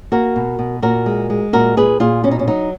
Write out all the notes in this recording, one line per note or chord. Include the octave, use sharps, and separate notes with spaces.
A#3 F#4 A#4
B2
B2
A#2 F#4 A#4
G#3
G#3
A#2 F#4 A#4
A#2 G#4 B4
A#2 F4 G#4
B2 C#4
D#4
C#4
F#3 D#4